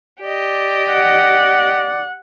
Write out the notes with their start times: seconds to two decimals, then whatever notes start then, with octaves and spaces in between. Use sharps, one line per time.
0.23 G4 D5 D#5
0.91 F#5